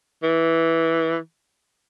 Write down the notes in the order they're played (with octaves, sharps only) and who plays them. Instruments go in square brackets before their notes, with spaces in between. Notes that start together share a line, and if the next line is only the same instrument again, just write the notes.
[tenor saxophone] E3